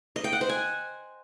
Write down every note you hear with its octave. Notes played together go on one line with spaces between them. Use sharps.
D#5
G5
F#5
C5
G#5